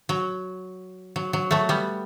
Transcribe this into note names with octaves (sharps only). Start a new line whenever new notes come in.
F#3
F#3
F#3
F#3 A3
G3 B3